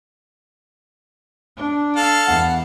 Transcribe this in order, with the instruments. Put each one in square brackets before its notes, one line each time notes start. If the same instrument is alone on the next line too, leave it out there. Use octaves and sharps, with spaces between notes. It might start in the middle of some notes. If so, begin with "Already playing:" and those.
[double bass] D4
[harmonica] A4 F5
[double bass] E2 [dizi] F#5